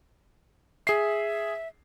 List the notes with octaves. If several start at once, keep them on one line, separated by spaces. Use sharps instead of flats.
G#4 E5 C7